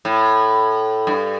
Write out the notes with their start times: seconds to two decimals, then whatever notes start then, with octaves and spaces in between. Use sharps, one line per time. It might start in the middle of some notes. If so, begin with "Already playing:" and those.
0.05 A2
1.07 G2